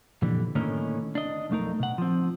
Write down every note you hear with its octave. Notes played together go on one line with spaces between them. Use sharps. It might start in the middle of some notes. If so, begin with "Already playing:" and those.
F2 A#2 D3 E3 G3
A2 D3 D#3 A#3 C#4 D#4
D4 D#5
B1 F2 A3 D#4 A#4
B2 F#5
F3 C4